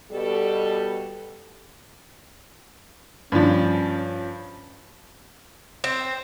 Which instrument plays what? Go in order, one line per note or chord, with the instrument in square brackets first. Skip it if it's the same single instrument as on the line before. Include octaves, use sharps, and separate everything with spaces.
[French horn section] B2 G3 A4
[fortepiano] G2 F3 [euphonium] C#4
[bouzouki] C4